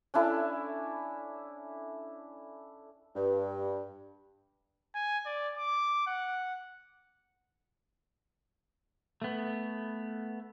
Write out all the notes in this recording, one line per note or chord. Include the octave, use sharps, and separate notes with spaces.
C#4 D4 E4 A4
G2
G#5
D5
D6
F#5
A3 B3